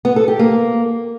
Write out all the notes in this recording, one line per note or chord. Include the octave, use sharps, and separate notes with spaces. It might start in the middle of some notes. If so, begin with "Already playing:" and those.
B3
A4
G4
A#3